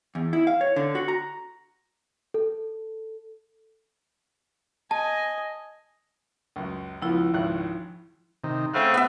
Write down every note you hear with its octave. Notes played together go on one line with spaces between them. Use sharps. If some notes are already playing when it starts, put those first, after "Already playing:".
E2
E4
F5
C#5
D3
F#4
A#5
A4
D#5 G#5 A5
C#2 F#2
C#2 F3 B3 E4 F4
G#1 C#2 F#6
C3 D#3
C#3 A3 C4 F5 F#5
B3 E5